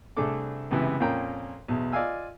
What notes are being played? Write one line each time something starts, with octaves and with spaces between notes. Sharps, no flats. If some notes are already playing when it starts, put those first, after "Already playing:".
C2 A3 D4 G#4 A4 D6
C#2 F#2 C3 E3 B3
F2 A#2 A#3 C#4 G5 A#5
B1 E2
F4 D5 D#5 F5 G#5 E6